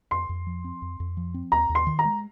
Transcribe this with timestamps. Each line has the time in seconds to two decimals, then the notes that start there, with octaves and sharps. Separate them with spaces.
0.11 F2 C6
0.29 F2
0.47 F3
0.64 C4
0.82 F2
1.00 F2
1.17 F3
1.34 C4
1.52 D#2 A#5
1.69 D#2
1.75 C6
1.87 D#3
1.99 A#5
2.05 G#3